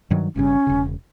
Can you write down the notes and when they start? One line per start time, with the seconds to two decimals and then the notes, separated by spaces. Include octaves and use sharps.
0.11 G2 D#3 F#3
0.36 G1 G2 C#3 C#4
0.67 E1 C#3